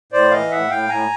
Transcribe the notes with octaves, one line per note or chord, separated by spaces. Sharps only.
A2 C5 D5
E3 D#5 F5
A2 E5 F#5
A2 F5 G5
A2 G#5 A#5